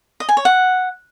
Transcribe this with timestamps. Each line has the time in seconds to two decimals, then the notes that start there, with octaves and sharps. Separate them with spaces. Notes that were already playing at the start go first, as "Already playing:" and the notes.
0.20 D#5
0.29 G#5
0.37 C#5
0.45 F#5